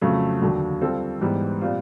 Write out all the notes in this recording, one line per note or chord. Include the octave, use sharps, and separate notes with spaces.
F2 C#3 F#3 A3
D#2 D3 F#3
G3 C4 F4 A4
G#2 E3 G3 B3
A#2 G3 C4 F4